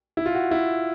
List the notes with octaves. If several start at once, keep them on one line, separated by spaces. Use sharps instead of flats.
E4
F4
F#4
E4